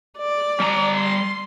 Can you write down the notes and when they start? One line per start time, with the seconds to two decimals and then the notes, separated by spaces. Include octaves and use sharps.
0.18 D5
0.60 G3 A5 A#5
0.97 C6